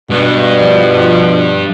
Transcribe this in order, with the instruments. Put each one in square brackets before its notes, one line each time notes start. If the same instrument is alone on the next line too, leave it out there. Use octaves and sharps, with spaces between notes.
[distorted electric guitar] G2 [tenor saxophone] B2
[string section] F3 G3